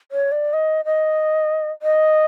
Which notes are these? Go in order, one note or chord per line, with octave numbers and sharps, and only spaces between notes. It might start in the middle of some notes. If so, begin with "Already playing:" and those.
C#5
D5
D#5
D#5
D#5